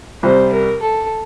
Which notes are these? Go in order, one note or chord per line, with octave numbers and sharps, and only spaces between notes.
C2 C3 G3 C5
A#4
A4